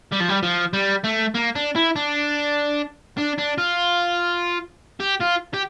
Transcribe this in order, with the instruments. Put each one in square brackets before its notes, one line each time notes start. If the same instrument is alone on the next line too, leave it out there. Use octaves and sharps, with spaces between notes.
[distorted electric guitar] G3
F3
G3
F3
G3
A3
A#3
D4
E4
D4
D4
D4
F4
G4
F4
G4